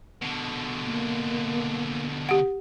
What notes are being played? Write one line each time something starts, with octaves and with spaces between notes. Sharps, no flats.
B2 D3
A#3
G4 F#5